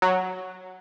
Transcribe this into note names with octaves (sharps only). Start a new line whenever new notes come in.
F#3